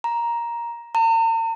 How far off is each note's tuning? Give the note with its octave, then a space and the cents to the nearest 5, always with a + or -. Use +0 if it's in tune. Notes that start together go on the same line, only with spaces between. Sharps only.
A#5 +10
A#5 -45